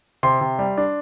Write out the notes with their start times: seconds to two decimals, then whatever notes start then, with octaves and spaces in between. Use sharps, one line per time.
0.23 C3 C6
0.41 C3
0.59 G3
0.77 D4